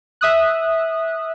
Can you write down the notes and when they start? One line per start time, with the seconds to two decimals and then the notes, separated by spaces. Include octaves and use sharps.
0.21 E5 D#6 F#6